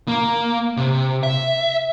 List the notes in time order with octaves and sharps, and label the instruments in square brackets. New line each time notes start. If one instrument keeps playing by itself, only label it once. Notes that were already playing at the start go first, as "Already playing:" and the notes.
[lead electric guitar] A#3
C3
E5